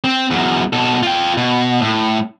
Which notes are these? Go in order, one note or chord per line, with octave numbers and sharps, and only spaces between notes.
C4
E2 F#3
B2 A4
F4 G5
B2
A2